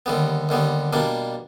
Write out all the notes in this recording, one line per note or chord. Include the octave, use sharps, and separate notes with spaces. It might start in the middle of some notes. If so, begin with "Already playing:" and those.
D#2 D3 G3 B3
D#2 D3 G3 B3
B2 G3 A#3 D4